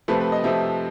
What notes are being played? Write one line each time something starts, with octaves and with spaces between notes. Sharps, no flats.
C3 F3 A3 B4
B4
D#5
C3 F3 A3 E5